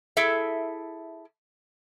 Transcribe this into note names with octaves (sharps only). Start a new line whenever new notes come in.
E4 G#4 A4 E5